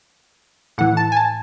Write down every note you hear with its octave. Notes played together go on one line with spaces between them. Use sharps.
A2 E3 F#5
A5
G#5
A5